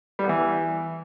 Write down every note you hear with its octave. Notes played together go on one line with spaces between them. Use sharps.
G3
B3
E3